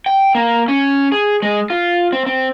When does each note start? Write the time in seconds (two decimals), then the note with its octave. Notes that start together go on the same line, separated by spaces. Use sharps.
0.06 G5
0.35 A#3
0.68 C#4
1.12 G#4
1.42 G#3
1.70 F4
2.13 C4
2.26 C4